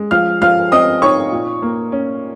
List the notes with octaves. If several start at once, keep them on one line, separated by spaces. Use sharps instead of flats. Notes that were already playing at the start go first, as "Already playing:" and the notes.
Already playing: G#3
F3 F5 F6
F3 F5 F6
C4 D#5 D#6
D#4 C#5 C#6
A#2
A#3
C#4